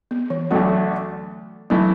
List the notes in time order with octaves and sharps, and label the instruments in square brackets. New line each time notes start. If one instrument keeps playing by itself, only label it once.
[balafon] B3
E3
[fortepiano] D2 D3 A3 F#4 [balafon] F#3
[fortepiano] E3 A3 E4 [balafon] F#3